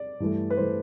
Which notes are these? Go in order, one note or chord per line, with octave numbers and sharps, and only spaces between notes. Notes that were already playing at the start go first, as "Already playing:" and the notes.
Already playing: D5
G2 E3 A3
B4
E3 A3 C5